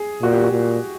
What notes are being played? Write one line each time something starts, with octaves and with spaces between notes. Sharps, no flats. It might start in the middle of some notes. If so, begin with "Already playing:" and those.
Already playing: G#4
A#2 F#4
G4
F#4
A#2